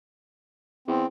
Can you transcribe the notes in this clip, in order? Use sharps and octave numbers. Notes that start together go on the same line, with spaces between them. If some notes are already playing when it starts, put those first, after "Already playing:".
E2 C4